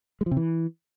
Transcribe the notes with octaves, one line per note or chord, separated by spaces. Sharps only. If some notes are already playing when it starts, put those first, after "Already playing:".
G#3
F3
C3
E3